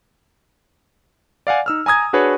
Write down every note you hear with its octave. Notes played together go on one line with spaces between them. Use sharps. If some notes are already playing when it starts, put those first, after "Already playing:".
D5 F5 F#5 G#5
D#4 E6 F6
G#5 A#5 D#6 G#6
D4 F#4 G#4 B4 C#5